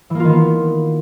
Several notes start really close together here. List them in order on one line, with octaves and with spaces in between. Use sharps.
E3 A#3 F4 D#3 B3